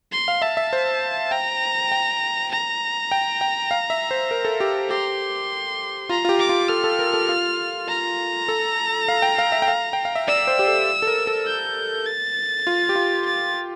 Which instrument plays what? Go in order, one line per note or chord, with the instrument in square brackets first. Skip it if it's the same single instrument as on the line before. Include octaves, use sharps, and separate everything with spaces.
[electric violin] C6
[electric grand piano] F5
[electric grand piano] E5 [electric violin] A5
[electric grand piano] E5
C5
[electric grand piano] G5 [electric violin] A#5
[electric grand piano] G5
[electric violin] A#5
[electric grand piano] G5
G5
F5
E5
C5
A#4
A4
G4
[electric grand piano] G4 [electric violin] C6
[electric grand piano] F4 [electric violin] A#5
[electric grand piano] F4
G4
[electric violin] D6
[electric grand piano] F4
[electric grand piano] A4 [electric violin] F6
[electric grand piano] A4
A#4
A4
F4
[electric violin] A#5
[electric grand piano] A4
F5
G5
F5
E5
G5
F5
G5
F5
E5
[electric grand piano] D5 [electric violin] E6
[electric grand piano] C5
G4
A4
A4
A#4
A4
[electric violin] G6
A6
[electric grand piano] F4
G4
F4
[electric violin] A6